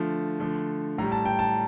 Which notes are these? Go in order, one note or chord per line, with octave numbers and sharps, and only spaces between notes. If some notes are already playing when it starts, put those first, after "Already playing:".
Already playing: D3 F3 A3
D3 F3 A3
A2 G3 A#5
A5
G5
A5